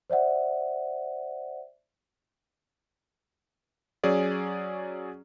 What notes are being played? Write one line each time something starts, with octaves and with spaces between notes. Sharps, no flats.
C5 D5 E5 F#5
F#3 C#4 G#4 D5